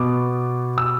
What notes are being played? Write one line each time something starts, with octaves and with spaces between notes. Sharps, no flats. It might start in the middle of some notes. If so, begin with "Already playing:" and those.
Already playing: B2 B3 D6
E6